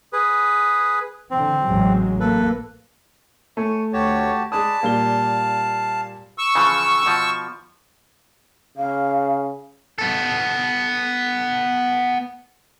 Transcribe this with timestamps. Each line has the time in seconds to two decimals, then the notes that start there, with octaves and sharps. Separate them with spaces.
0.13 G#4 B4
1.31 D3 E3 C4
1.66 A1 F#3 G#3
2.21 A#3 A4 B4
3.57 A3 C#5 G#5
3.93 D2 F#4 G4 C#5 A5
4.52 G#3 G#4 B4 D5 A5 D#6
4.83 A#2 G3 F5 G7
6.38 C#6 E6
6.55 C#3 E3 F3
7.06 B2 F3
8.77 C#3 F5
9.98 B3 A4